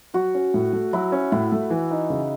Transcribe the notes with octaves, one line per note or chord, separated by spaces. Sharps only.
F#3 F#4
C#4
A2
A3
F#3 E4
C#4
A2 E4
A3
E3
D#4
C#3